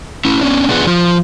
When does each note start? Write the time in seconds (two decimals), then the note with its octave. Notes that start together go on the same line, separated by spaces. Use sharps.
0.25 C#4 E4
0.41 B3 C#4 D4
0.69 B3 D4 F4 G#4 B4 F#5
0.87 F3 F4